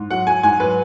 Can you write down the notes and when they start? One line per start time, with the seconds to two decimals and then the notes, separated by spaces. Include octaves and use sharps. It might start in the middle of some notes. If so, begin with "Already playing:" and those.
Already playing: G#2
0.10 F#3 F#5
0.27 F#3 G#5
0.43 G#2 G#5
0.60 F#3 B4